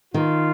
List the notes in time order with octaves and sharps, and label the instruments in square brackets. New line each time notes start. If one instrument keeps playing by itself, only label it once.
[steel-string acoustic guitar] D#3 [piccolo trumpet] F4